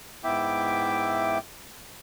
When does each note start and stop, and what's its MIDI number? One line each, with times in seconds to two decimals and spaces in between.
0.24 1.38 44
0.24 1.38 59
0.24 1.38 64
0.24 1.38 76
0.24 1.38 79
0.24 1.38 86